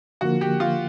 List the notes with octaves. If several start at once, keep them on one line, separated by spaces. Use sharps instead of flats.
D3 F3 A#3 F#4
G4
F4